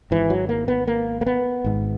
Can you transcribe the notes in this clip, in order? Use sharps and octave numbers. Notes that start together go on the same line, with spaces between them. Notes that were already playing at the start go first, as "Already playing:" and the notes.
G#1 G#2 E3
F#3
A#3
B3
A#3
A#3
B3
G#1 G#2